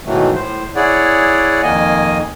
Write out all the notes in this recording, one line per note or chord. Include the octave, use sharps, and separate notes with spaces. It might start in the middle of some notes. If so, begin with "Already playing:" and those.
G#2 B2 D#3 E3 F#3 A3
A2 C5
E4 G#4 C#5 D5 F#5
F2 D#3 A#3 D#5 G#5